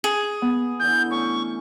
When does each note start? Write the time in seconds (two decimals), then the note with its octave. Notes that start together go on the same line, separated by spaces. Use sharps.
0.04 G#4
0.42 B3
0.80 D3 E3 G6
1.11 A3 C#4 C#6